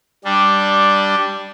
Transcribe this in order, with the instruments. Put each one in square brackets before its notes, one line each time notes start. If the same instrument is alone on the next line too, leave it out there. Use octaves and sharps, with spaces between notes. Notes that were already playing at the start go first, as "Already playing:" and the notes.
[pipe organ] G3 D4